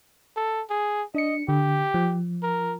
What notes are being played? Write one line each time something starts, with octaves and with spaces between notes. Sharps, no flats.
A4
G#4
D4 D#5 C#7
D3 G4
F3
A#4